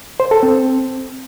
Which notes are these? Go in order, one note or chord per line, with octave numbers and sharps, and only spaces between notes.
C5
A4
C4